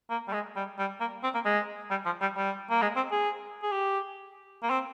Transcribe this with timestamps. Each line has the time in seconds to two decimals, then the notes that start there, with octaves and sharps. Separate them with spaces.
0.10 A#3
0.28 G3
0.33 G#3
0.56 G3
0.78 G3
1.00 A#3
1.23 C4
1.34 A#3
1.45 G#3
1.90 G3
2.05 F3
2.21 G3
2.36 G3
2.70 A#3
2.82 G#3
2.96 C4
3.11 G#4
3.63 G#4
3.72 G4
4.63 A#3
4.70 C4